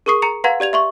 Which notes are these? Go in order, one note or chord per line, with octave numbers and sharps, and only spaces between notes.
G#4 A#4 C#6 D#6 C7
A#5 C#7 F7
B4 F5 F#5 A#5 C6 G#6
G4 D5 G#6 F7
E5 C6 C#6